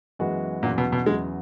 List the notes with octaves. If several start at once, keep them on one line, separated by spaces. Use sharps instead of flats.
F#2 E3 G#3 B3 F#4
E2 A#2 C#3 F#3
B2
B2
E2 C#3 F#3 G#3